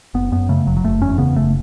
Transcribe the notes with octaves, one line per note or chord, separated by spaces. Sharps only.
F#1 B3
F#2 B3
C#3 A3
F#1 F#3
F#3
F#1 A3
E2 C#4
C#3 B3
F#1 A3